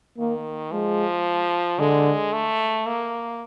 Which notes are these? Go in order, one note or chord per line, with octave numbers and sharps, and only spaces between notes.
D#3 A#3
F3 G#3
D3 G#3
A3
A#3